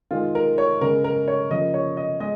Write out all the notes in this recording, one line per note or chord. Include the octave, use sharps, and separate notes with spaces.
D#3 G#3 F4
A#4
C#5
C#3 G#3 A#4
A#4
C#5
C#3 F3 A#3 D#5
C#5
D#5
G#3 D#5